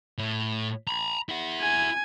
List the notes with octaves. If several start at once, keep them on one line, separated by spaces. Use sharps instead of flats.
A2
A#5 B5
E4 F#5
G#5